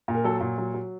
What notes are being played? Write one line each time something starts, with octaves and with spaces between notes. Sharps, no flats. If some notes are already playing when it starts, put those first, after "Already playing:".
A#2
A#4
F#3 A4
A#2
F#3
F#3